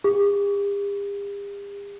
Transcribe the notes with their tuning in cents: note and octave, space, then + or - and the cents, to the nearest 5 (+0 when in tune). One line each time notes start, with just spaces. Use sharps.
G4 +45